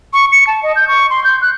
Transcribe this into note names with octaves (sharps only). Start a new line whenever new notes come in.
C#6
C#7
A5
D#5
G6
C#6
C6
G6
F#6